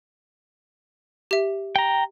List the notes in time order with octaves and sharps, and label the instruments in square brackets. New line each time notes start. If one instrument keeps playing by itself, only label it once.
[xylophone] G4 E5
[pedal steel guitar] G5 A#5